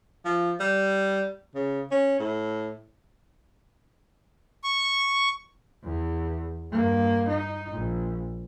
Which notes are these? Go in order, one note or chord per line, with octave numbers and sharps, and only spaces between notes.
F3
G3
C#3
C#4
A2
C#6
E2
G2 A#3
D#4
A#1